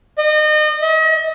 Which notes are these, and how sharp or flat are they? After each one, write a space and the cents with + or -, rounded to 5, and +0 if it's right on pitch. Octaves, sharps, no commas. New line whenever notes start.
D#5 -35
D#5 +40